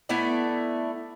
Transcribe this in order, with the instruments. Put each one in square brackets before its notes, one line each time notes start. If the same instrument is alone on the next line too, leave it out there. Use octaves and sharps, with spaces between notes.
[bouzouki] A3 B3 E4 D5